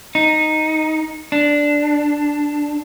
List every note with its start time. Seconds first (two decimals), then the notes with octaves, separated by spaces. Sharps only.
0.15 D#4
1.32 D4